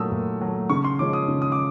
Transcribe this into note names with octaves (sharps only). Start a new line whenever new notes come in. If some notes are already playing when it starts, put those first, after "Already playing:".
Already playing: A#2 F#3 A3 D#6 E6
A#2
F#3 A3
C#3 C#6
C6
F3 G#3 C#4 D6
D#6
C#3
D#6
D6